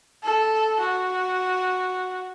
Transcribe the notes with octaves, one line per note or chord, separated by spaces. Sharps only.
A4
F#4